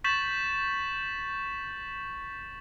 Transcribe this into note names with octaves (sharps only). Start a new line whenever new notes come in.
C#6 G6 A6 B6 E7 F#7